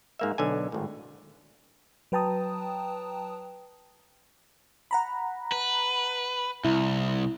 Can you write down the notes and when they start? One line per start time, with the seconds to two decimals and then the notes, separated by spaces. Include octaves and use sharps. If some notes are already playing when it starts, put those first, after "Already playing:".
0.19 G#2 A#3 E5
0.38 B1 D3 G#5
0.72 G#1 A2
2.12 F#3 B4 G5 A5 A#5 D#6
4.91 F#5 A#5 B5
5.52 B4
6.64 C2 E4